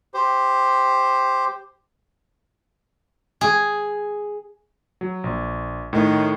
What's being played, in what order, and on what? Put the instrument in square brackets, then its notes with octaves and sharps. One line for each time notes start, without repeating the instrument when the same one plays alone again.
[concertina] G4 C5
[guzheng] G#4
[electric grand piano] F#3
A#1
[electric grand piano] A2 [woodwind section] D#3